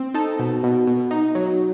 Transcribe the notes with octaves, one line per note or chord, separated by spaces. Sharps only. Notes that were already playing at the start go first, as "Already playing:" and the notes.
Already playing: C4
D#4 A4
B2
B2
B2
D#4
F#3